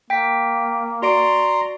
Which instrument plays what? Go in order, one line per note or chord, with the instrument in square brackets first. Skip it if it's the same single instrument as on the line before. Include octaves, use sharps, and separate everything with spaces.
[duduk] A#3 [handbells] G5 B6
[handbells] F#4 D5 D7 [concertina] A#5 C6